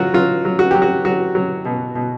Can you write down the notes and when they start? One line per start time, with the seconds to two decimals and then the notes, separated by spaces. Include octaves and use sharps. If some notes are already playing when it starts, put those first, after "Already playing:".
Already playing: F#3 F4 F#4
0.14 F#3 F4
0.45 F#3
0.59 F#4
0.71 F#3 G4
0.82 F#4
1.05 F#3 F#4
1.35 F#3
1.65 B2
1.95 B2